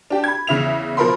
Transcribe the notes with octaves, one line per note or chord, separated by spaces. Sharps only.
D4 G4
B5 G#6
E2 C#3 E5 F7
B2 F3 A#4 B5 C6